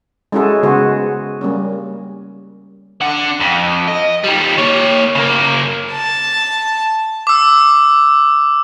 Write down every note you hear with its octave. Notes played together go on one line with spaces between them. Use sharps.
G#3 C#4 E4 F#4 G#4 A4
C#3 G#3 B3 F#4 G#4 C5
G3 A#3 C#4
D4 F#5
F2
D#5
D#3 G3
A#3 C#5
C#3 A#3
A5
D6 E6